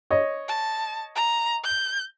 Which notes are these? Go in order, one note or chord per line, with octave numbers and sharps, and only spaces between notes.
C#5 D#5
A5
A#5
G6